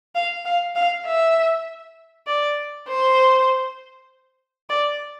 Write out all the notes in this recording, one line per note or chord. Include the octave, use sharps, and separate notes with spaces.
F5
F5
F5
E5
D5
C5
D5